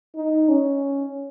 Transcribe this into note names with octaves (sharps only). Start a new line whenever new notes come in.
D#4
C#4